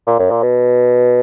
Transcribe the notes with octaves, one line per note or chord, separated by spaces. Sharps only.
A#2
F#2
A#2
B2